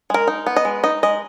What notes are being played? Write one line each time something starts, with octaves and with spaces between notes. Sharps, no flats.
G#3 A#4
D#4
B3
D#5
G#3
D#4 D#5
G#3 D#5